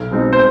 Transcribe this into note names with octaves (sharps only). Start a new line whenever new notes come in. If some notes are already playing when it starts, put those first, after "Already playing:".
Already playing: B1
B2 G#3 C4 D#4
C5